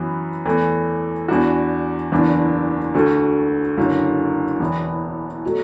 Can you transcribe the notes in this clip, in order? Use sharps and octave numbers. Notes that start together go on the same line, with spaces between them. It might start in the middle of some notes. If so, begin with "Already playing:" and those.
Already playing: F#2 E3 B3
E2 E3 A3
E2 E3 D4 F#4
F#1 E2 E3 D4
D2 D3 A3 F#4
F#1 F#2 D3
E1 E2 E3 B3
B2 F#3 A3